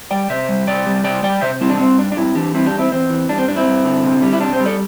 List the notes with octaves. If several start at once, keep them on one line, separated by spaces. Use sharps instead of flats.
G3 D5 G5
C3 C5 E5
G3
C3 D5 G5
G3
C3 D5 G5
G3 D5 G5
C3 C5 E5
G3 C4 E4
D4
G3 C4
G2 D4
D4
G2 C4 E4
E3 D4 G4
G3 C4 E4
D4 G4
E2
C4 E4
E2 C4
E3
G3 D4
C4
G2 D4
C4 E4
G2
D3
C3
G3
E4
C3 D4
C4
G3
A4 D5